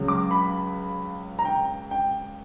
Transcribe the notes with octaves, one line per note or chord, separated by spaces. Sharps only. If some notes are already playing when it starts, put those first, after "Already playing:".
Already playing: C#2 C#3 F#3
D6
B5
A#5
G5
G5